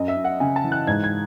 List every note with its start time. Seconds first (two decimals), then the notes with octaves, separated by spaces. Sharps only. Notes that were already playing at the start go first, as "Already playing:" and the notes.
Already playing: F#2 D#5
0.08 E5
0.17 F#2
0.24 F#5
0.40 C#3 G#5
0.56 A5
0.64 E3
0.72 F#6
0.87 G#2 G#6
1.04 G#6